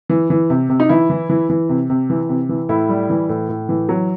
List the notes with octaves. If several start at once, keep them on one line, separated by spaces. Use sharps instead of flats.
E3
E3
C3
C3
D#4
E3 E4
E3
E3
E3
C3
C3
E3
C3
E3
A2 E4
G3
E3
A2
A2
E3
F#3